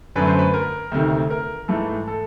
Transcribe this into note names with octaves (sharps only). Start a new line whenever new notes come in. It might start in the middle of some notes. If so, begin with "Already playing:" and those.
F#2 D3 F#3 A3 B4
C5
B4
A#4
D2 C3 D#3
A#4
G#2 E3 A3 A4
A4